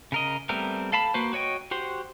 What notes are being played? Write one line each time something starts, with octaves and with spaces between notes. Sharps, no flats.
C#3 A#4 D#5
G3 A3 B3 C4 A#4
A4 F5 A5 B5
A#3 F#4 B4 C5
F#4 C#5 D#5 G5
F#4 G4 C5